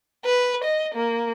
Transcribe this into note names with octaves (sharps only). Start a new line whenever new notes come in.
B4
D#5
A#3